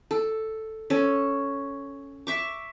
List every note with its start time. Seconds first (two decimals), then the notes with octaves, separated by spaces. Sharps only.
0.11 A4
0.90 C#4 A4
2.27 E5 C#6 D6